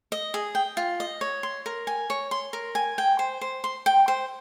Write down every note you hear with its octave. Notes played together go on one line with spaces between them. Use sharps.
D#5
G#4
G5
F4
D#5
C#5
C6
A#4
G#5
C#5
C6
A#4
G#5
G5
C5
C5
C6
G5
C5